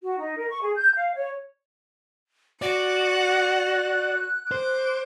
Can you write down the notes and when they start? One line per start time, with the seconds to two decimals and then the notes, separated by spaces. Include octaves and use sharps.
0.02 F#4
0.19 D#4
0.37 A#4
0.49 C#6
0.61 G#4
0.76 G6
0.95 F5
1.15 C#5
2.62 F#4 D5 F#5
3.25 F#6
4.52 C5 D6